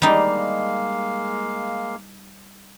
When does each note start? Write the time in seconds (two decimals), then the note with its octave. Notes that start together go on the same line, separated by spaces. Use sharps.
0.02 G3 G#3 A#3 D#4 F5